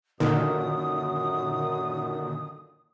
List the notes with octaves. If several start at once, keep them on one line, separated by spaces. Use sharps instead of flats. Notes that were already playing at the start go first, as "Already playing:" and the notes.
F#2 A#2 D3 D#3 D#6